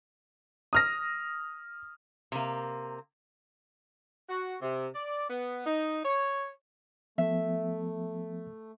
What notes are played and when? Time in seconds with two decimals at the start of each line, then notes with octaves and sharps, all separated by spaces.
0.73 D#6 F6 A#6
2.32 C3 A#3
4.29 F#4
4.61 C3
4.94 D5
5.29 B3
5.65 D#4
6.04 C#5
7.18 F3 A3 B3 E5